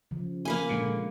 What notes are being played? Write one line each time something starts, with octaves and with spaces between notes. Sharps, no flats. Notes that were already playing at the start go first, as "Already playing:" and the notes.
C#3 F3
A#3 B4 G#5
A#2 D3 G#3